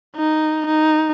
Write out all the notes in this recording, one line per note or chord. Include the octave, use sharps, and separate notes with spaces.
D#4
D#4